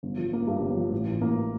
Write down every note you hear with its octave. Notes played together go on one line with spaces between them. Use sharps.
G1
F3
A#3
G2
G1
F3
A1
E3
A#3